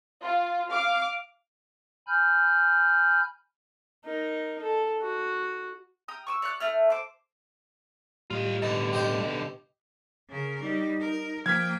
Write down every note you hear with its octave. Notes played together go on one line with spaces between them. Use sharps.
F4
F5 D6 F6
G#5 B5 F6 G6
D#4 A#4
A4
F#4
G5 A#5 D#6
C#6 D6 E6
C#5 D5 E5 F#6
A3 E4 F6
C5 D6
A2 G3 F4 D#5
B2 D3 D#4
G4 C5 D#5
C#3 A#4
G3 D#4
A#4
F3 A#3 G5 F6 G#6 B6